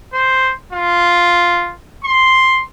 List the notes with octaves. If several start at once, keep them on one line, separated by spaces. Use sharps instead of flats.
C5
F4
C6